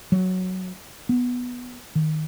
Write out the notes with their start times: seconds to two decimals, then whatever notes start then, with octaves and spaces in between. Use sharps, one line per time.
0.12 F#3
1.09 B3
1.95 D#3